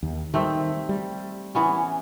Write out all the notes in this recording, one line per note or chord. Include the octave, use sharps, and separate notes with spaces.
D#2
D#3 G3 A3 C4 E5
G3
E3 B3 C#4